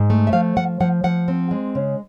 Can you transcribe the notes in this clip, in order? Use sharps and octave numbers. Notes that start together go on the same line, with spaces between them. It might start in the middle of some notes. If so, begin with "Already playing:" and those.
Already playing: G#2
A3
E5
F3 F5
F3 F#5
F3 F#5
F3 F#5
C4
G#3
C#3